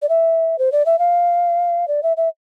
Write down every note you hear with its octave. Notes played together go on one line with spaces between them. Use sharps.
D5
E5
C5
D5
E5
F5
D5
E5
E5